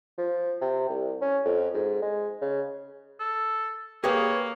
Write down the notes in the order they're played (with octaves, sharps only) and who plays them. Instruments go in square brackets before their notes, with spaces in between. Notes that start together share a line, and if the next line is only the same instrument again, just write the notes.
[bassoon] F3
C3
C2
C#4
F2
G#2
G#3
C#3
[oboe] A4
[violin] A#3 [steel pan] G4 [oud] G#4 B4 F5 [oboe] C#5